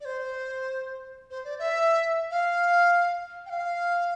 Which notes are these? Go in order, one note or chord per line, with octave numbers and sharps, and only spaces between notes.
D5
C5
C5
D5
E5
F5
G5
F5